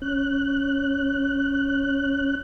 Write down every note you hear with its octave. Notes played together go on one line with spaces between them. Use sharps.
C#4 F#6